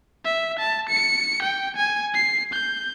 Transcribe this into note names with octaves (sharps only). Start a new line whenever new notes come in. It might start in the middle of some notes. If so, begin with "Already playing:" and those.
E5
A5
C#7
G5
G#5
C7
G6